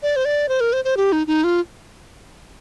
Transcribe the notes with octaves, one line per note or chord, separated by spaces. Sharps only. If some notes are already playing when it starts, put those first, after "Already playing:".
D5
C5
D5
C5
A#4
C5
C5
G4
D#4
D#4
F4